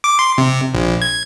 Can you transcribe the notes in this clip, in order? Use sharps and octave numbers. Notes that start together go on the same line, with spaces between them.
D6
C6
C3
A#1
G#6